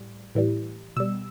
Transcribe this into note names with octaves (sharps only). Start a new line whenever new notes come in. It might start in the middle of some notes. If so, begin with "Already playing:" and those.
Already playing: A2 G3
A2 E3 G3
B2 G3 E6